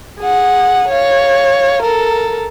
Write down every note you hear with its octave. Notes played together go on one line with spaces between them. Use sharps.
G#4 F#5
C#5 F5
A4 A#4